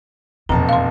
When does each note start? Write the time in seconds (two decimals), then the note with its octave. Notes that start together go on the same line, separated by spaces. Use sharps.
0.49 F1 A#1 E2 B2 A5 A#5
0.69 F5 C6